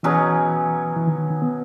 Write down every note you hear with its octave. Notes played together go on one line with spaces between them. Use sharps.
B2 E3 F#3 C#4 G#4
E3
D#3
D#3
D#3
B3